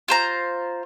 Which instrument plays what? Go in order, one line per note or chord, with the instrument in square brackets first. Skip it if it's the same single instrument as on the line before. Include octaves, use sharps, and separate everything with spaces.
[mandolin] F4 C5 A#5